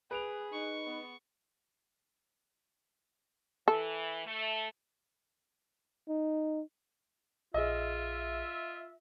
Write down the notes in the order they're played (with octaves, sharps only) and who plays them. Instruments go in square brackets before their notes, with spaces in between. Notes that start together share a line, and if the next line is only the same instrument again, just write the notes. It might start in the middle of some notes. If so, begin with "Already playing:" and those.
[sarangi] G#4 [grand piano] B4 D7 F7
[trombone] D#4 [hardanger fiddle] C#6
[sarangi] B3
[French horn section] E3 [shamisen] A4
[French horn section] A3
[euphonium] D#4
[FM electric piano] A#1 G#4 [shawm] F4 [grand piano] D#5 [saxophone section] E5